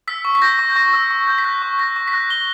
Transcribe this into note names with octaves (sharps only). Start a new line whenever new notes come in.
E6 B6
C#6
B6
G6 A#6
C#6
G6
C#6 A#6
E6
C#6
G6
B6
F#6 A#6
C#6
F#6 A#6
C#6
B6
F#6 A#6
C#6 G7